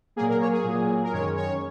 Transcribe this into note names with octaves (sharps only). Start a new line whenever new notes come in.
A#2 F#3 A#3 G#4
A#4
C#5
G#4
A#2 F#3 A#3
A#4
F#2 D#3 G#3 C#4 C#5
C#5